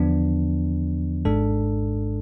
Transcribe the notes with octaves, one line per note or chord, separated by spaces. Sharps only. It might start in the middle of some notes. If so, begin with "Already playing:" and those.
Already playing: E2 D3 F3 B3 D4
G#1 G#2 G#3 D4 A4